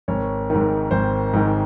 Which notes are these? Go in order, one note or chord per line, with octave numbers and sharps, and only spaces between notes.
G#1 C#5
G#2 D#3
G#1 C5
G#2 D#3